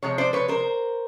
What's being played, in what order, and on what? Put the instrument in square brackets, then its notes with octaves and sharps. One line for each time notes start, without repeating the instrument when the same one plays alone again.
[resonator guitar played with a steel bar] C3 F3 G#3 C#5
C5 D5
B4 C#5
A#4 C5